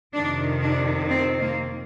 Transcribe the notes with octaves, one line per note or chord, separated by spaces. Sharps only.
F2 C3 D#3 D4
D4
C4
A#3